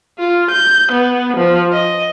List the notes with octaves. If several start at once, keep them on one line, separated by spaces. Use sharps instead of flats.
F4
G6
B3
F3
D#5